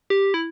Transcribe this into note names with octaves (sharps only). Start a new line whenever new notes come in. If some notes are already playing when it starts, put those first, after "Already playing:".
G4
E4